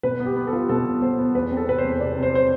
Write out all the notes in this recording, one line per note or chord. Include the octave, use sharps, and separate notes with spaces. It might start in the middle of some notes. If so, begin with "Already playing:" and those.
B2 B4
B3
G4
B3
A4
F4
B2 A4
B2
B3 C5
B3
E2 B4
C4
A4
C3 B4
C5
E2
C3 D5
C3
C5
C5